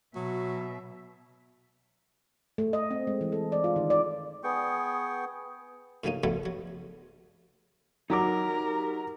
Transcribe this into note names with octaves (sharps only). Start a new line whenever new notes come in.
B2 F#3 E5
A3
D#5
C4
G#3
E3
A4
D5
F4
D#3
D5
B3 G#4 G5 C#6
A2 C#3 F#3 A#3 C#4 D#4
D2 C#3 F3 F#3 A3 B3
F#3
F#3 D#4 G4 A#4 D#5 D6